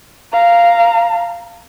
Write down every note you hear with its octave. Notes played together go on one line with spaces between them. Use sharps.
F5 A#5